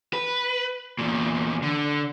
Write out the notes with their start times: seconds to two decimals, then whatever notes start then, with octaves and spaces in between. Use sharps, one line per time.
0.13 B4
0.99 E2 A#2
1.63 D3